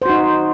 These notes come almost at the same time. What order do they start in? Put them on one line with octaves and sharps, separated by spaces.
C5 F#4 D#4